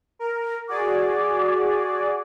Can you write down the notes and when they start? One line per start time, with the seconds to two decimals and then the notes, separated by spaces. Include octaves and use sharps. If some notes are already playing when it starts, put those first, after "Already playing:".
0.19 A#4
0.69 F#4 G#4 D5 D6